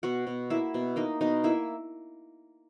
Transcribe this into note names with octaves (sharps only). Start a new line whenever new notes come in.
B2 F#4 F#5
B2
A#3 E4 E5
B2
A#3 D#4 D#5
B2 D#4 D#5
A#3 E4 E5